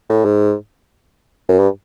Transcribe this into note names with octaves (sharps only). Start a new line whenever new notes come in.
A2
G#2
F#2
G2